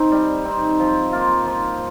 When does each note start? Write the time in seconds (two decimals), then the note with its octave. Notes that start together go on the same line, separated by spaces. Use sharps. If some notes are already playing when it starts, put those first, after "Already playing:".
Already playing: C4 D#4
0.12 G3
0.45 C4 D#4
0.80 F3
1.12 A#3 F4
1.46 F3